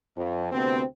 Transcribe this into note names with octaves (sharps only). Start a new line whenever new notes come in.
F2
D2 C3 B3 C4